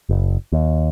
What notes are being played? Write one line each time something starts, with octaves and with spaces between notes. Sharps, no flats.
F#1
D#2